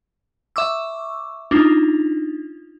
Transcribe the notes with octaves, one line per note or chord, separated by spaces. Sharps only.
E5 C#6 D6 E6
D4 D#4 F4